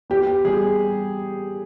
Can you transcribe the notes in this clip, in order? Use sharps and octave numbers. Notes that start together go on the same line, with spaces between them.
B3 G4
G3 G#4